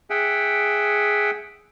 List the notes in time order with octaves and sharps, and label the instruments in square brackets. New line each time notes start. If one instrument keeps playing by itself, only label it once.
[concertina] G#4 E5 F#5 G5